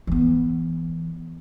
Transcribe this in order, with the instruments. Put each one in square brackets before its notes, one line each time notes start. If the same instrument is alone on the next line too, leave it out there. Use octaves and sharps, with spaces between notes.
[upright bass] E3 B3